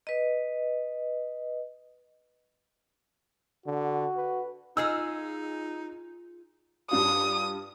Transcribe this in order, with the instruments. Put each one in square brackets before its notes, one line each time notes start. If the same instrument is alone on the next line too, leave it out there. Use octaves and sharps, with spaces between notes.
[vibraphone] B4 D#5
[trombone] D3 [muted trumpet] F#4
[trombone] B4
[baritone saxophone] D#4 [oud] F4 G#4 D#5 [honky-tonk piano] E6
[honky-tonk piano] G2 D4 F4 [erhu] D#6